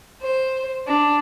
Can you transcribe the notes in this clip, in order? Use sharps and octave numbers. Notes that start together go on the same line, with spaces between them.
C5
D4